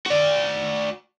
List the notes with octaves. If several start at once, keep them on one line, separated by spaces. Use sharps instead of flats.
F#4 D5